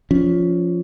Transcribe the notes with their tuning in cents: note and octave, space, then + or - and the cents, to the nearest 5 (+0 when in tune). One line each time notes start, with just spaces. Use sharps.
F3 +0 C#4 +20